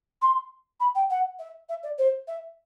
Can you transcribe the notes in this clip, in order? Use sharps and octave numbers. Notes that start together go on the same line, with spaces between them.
C6
B5
G5
F#5
E5
E5
D5
C5
E5